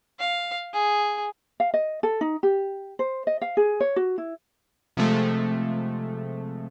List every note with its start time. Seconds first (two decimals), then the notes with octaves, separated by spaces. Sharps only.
0.19 F5
0.73 G#4
1.60 F5
1.74 D#5
2.03 A4
2.21 D#4
2.43 G4
2.99 C5
3.27 D#5
3.42 F5
3.57 G#4
3.80 C#5
3.96 F#4
4.18 E4
4.97 C3 F3 G#3 A3